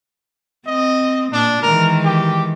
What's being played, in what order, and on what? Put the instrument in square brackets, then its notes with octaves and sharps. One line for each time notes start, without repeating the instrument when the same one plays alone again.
[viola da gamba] C4 [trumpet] D#5
[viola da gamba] A#2 [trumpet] D4
[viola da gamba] D#3 E3 G#3 [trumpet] A#4
[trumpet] G4